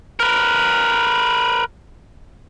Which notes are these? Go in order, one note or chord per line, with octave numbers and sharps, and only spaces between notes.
A#4 B4